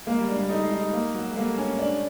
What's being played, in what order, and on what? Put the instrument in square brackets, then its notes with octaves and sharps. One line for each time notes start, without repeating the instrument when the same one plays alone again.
[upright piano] G#3 [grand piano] A#3
[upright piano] G3
[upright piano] G#3 [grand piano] D4
[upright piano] G3
[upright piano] A3 [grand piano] D#4
[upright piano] G#3
[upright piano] G3 [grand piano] D#4
[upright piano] G#3
[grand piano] A#3
F#3
[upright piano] G#3
[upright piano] G3 A3 [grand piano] A#3
[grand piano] C#4
D4